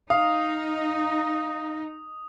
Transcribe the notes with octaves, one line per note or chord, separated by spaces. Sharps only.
D#4 F5 D#6